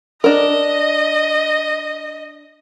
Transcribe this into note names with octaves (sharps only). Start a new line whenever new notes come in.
D4 A#4 D#5